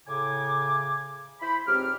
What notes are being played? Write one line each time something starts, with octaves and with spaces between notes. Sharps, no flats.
A2 C#3 G#5 D6
E4 C5 B5
C#2 G#2 C4 G4 D6 F6